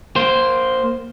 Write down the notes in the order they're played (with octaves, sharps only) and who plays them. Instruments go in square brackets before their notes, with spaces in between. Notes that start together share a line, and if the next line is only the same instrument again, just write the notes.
[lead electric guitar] A#3 C5